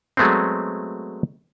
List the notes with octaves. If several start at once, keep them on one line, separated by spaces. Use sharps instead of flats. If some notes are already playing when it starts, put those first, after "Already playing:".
F#3 G#3 A3 B3 C4